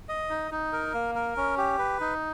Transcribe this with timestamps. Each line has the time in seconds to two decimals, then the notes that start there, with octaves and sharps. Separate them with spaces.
0.09 D#5
0.30 D#4
0.51 D#4
0.73 A#4
0.94 A#3
1.15 A#4
1.37 C#4
1.58 G4
1.79 B4
2.00 D#4